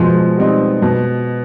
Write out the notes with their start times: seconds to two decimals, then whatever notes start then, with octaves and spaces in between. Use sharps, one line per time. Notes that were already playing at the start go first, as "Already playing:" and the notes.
Already playing: B2 F3 G#3
0.37 G3 C4 D#4
0.82 B2